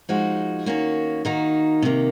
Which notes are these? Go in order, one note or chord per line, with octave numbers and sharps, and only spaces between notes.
F3 G#3 D#4 F#4
D#3 A#3 C#4 F#4
D#3 A#3 D#4 F#4
C3 D#3 A#3